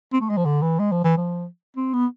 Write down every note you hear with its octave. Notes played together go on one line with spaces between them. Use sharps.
C4
A3
G#3
F3
D3
E3
G#3
F3
E3
F3
C4
B3